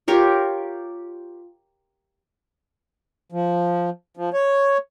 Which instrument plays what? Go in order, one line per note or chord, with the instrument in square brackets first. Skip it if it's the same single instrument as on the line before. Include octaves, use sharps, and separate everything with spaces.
[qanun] F4 G4 A#4 C#5
[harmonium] F3
F3
C#5